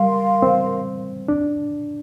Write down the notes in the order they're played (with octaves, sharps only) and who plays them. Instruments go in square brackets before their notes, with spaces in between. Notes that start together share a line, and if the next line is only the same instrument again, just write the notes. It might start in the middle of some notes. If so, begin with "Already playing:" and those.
Already playing: [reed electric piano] G3 [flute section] A#4 F5 C6
[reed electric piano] C4
D4